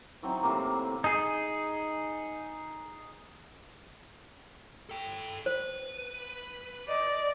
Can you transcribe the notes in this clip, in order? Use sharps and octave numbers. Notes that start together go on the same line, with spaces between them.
E3 F#3 C4 D#4
A2 C3 E3 A#3
D#4 G#4
A4 G5
B4 C5
D5 D#5